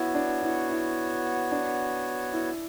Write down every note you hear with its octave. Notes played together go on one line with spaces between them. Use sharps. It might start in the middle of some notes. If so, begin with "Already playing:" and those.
Already playing: B3 E4 F#4 C#5
D4
E4
E4
D4
E4